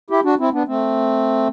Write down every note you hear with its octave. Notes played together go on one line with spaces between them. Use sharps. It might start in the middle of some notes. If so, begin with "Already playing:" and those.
E4 G4
D4 F#4
C4 E4
B3 D4
A3 C4